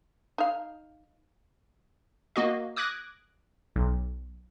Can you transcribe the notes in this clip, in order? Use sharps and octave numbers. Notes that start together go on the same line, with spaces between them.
D#4 F5
A#3 F#4 D#5
D6 D#6 F#6 G#6 A#6
B1